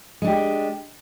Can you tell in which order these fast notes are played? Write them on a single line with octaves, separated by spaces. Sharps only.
G#3 D4 G4